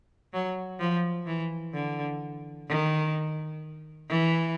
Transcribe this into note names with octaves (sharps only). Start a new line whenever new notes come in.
F#3
F3
E3
D3
D#3
E3